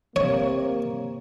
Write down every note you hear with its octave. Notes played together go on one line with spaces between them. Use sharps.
C3 A#3 C#5